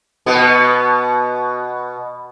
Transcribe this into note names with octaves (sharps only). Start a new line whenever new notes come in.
B2 B3